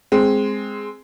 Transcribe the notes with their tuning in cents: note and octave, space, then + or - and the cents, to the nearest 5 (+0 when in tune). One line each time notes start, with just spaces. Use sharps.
G#3 +0 C4 +0